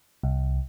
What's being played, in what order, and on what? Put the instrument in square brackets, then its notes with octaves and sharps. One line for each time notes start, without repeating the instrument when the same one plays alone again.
[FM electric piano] C2